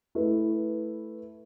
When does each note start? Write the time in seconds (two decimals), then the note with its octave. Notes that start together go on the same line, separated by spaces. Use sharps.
0.15 A3 E4 B4